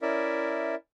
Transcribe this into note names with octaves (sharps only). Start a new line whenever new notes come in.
C#4 E4 A#4 D5 E5